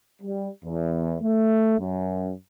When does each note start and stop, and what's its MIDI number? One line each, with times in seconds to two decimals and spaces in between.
0.22 0.49 55
0.64 1.16 40
1.21 1.78 57
1.79 2.32 42